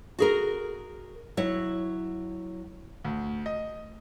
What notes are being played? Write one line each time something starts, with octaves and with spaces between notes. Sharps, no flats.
F#4 G#4 A#4
F#3 E4 C#5
D2
D#5